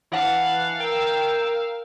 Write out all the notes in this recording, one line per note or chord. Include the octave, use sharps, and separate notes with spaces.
E3 F5 F#5 A5
A#4 G5 E6